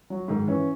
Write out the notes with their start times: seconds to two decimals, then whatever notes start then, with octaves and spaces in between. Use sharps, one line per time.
0.10 F#3
0.28 G#2 D#3
0.47 E3 C#4